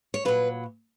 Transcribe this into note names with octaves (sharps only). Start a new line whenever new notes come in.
C#5
A#2 F#3 B4